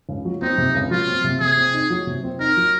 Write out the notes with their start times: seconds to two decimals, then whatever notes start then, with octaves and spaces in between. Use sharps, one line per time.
0.09 C#2
0.25 F#3
0.42 C4 D#4
0.58 C3
0.75 C#2
0.91 F#3 F4
1.07 C4
1.24 C3
1.40 C3 G#4
1.57 C4
1.74 D#4
1.90 F#3
2.07 C3
2.24 C4
2.39 D#4 A#4
2.57 F#3